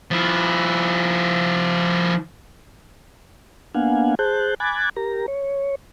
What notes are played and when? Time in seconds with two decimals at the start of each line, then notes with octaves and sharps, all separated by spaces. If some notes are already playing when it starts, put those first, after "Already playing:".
0.11 F3 E4
3.74 A#3 B3 D4 F5 F#5 G#5
4.19 G#4 C5 A5 F#6 G6
4.60 G#5 B5 D6 F#6 G#6 A6
4.96 G4 A#4 A#5
5.28 C#5